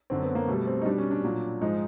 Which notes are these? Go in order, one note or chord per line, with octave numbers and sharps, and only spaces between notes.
F#2 D3 F#3 C4
B3
A#3
B2 G3 A3
C4
D#4
B2 G3 D4
C#4
D4
A#2 F#3
G#2 F3 G#3 D#4